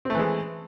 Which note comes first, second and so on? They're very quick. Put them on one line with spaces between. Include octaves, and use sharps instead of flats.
C4 A3 E3 G#3